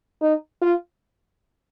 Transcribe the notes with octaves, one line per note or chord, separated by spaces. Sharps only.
D#4
F4